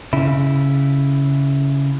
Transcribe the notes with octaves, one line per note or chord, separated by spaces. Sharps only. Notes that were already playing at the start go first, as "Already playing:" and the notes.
C#3 E4